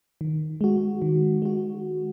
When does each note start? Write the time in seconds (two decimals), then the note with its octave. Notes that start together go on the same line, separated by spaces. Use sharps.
0.21 D#3
0.61 G#3 F#4
1.02 D#3
1.42 G#3 F#4